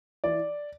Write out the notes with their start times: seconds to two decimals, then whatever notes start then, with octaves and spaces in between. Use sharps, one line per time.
0.24 E3 D5